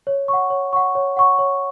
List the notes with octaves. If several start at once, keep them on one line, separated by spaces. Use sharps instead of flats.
C#5
F#5 C#6
C#5
F#5 C#6
C#5
F#5 C#6
C#5